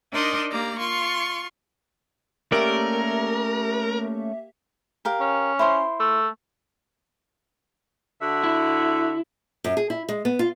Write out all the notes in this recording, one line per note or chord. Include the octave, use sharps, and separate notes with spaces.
D4 D#4 A#4 D5 D#5 C6
A#3 G4 D5 A#5
F4 C6 C#6
A3 A#3 C#4 G4 A#4 D5 E5
G4 A#4 F5
C#4
E4 C5 C6
A3
D3 F#4 E5
E4
F#2
G#4
E4
G#3
B3
F4